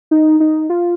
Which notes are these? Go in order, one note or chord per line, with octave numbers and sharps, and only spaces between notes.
D#4
D#4
F4